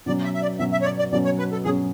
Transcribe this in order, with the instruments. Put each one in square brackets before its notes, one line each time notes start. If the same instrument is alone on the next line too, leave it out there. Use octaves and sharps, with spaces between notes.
[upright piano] B2 F#3 C#4 [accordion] D5
[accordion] E5
E5
D5
[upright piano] B2 F#3 C#4 [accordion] E5
[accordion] E5
C#5
D5
D5
[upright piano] B2 F#3 C#4 [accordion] D5
[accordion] C#5
B4
A4
[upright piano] B2 F#3 C#4 [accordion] G#4